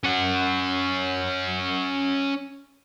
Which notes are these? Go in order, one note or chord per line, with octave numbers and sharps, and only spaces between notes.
C#4 F#5